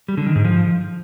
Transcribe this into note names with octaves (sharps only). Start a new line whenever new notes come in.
G3
D3
D#3
G#2
F3